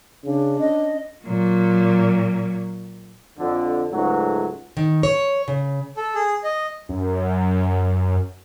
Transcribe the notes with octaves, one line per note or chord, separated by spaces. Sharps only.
C#3 D4
C#4 D#5
A#2 F#3
F2 D3
C#2 G#2 F#3 A3 F#4
D#3
C#5
C#3
A4
G#4
D#5
F#2